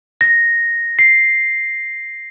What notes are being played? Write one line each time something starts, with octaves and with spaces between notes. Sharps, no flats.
A#6
C7